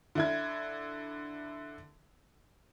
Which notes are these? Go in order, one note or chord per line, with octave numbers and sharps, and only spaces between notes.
D3 E4 G#6